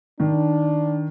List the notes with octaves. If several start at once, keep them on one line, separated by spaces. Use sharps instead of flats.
D#3 D4